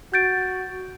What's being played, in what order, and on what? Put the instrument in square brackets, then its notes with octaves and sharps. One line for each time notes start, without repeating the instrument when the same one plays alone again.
[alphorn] F#4 [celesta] G6 A6 D7